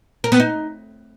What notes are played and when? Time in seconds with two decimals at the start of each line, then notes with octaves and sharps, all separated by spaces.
0.24 A#4
0.32 B3
0.40 D#4